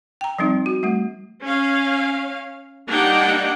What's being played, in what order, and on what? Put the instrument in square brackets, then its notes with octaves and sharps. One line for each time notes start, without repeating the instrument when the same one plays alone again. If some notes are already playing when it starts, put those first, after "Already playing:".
[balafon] G5 A#5
F3 G3 C4 D#4
F#4
G3 A3
[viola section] C#4 F5
G3 A#3 D4 D#4 F#5 G5